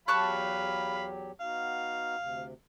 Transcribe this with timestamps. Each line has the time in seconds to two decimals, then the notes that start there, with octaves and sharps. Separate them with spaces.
0.08 E2 F#3 G4 F5 A5 B5 C#6 F#6
1.41 B3 D#4 F#4 F5
2.16 D2 C3